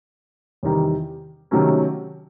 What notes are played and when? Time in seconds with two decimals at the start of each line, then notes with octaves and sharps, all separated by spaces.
0.63 E2 C3 D#3 G3
1.51 C3 D#3 F#3 A3 C#4